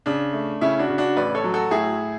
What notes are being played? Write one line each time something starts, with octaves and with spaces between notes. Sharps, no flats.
C#3 D4
A3
C#3 C#4 E4
D4 F#4
C#3
D4 F#4
A1 B4 D5
A4 C#5
F#3
F#4 A4
A2 E4 G#4